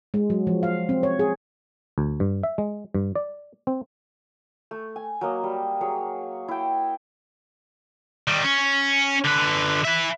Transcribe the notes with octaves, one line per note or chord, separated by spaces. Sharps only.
G#3
F#3
F3
F5
C4
C#5
G#4
D2
G2
E5
G#3
G2
D5
C4
A3
G#5
F#3 A#3 D#5
G3
F#3 G#4 C#5
E4 G5
D#3 G3
C#4
D3 B4
B4 E5